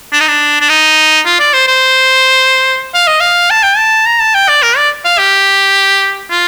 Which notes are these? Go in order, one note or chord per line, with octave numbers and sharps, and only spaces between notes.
D4
D#4
D4
D4
D#4
F4
D5
C5
C5
F5
D#5
F5
A5
G5
A5
A#5
A5
G5
D5
A#4
D5
F5
G4
F4